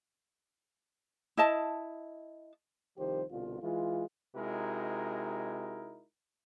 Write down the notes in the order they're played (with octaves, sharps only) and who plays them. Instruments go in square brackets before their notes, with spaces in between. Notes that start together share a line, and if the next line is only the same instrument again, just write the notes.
[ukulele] E4 D#5 A5
[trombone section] C2 D#3 F3 G4 C5
C2 B2 D3 F4
E3 G#3 F4
C3 G#3 D#4 E4 F#4 A#4